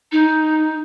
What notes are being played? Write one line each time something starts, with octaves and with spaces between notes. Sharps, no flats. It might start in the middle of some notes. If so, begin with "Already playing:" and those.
D#4